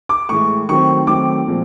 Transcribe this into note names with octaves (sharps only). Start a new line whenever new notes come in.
D6
A2 E3 G#3 C#6
D#3 F#3 A3 C4 C#6
D#3 F#3 A3 C4 D6
A#2 F3 G#3 C4